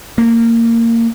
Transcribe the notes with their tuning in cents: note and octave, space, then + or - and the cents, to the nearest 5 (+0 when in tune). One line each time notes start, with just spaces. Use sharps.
A#3 -20